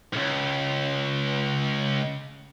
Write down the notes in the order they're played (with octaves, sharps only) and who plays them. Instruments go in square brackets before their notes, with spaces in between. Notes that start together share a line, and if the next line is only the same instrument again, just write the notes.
[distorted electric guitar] C#2 G#2